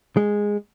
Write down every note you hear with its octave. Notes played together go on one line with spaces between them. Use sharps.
G#3